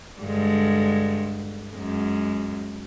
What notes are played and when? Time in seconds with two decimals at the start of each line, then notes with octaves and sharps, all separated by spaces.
0.22 G2 D3 G#3
1.74 F#2 G#3